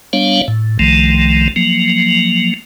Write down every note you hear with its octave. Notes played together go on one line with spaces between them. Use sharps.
G3 B3 D4 C#5 F5
A2
C2 D#3 F3 A3
F3 F#3 A#3